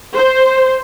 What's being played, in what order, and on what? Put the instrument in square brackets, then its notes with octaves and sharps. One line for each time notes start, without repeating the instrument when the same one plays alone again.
[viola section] C5